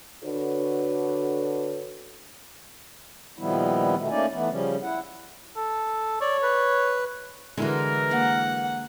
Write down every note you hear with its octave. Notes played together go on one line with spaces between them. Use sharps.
D3 D4 F#4 A4 B4 C#5
A#2 D#3 F3 G3 B3 E4
B2 D#3 A3
A3 A#3 C#4 D#4 D5 G#5
E3 A3 B3
C#3 F3 G3 C#4
E4 F#5
A4
C#5 D5
B4
D3 E3 G#3 E4 F#4 A#4
A#3 F#5